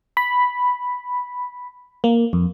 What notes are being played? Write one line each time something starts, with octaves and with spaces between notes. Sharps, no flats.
B5
A#3
F2